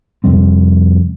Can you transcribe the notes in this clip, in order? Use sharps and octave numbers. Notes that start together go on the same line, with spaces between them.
F2 C3 G3 C4